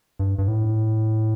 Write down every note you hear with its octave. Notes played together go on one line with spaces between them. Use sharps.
G2
G2
A2